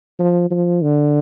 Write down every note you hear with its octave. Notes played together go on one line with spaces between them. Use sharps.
F3
F3
D3